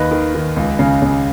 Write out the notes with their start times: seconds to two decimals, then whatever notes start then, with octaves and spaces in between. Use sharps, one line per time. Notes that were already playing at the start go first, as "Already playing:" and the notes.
Already playing: D#2 B4 D#5
0.11 D#3
0.35 D#3
0.56 C#2
0.79 C#3
1.02 C#3